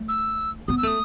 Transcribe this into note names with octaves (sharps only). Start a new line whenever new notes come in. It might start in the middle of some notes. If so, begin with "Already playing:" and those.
Already playing: A3
E6
B3 D#6
E6
A3 D#6